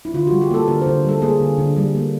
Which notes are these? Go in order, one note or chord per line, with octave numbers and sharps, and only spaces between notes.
E4
D3 F4
G3 F#4
G4
A#3 A4
D3 A#4
C5
D3
G3 A4
A#3 G#4
D3
D3
G3
A#3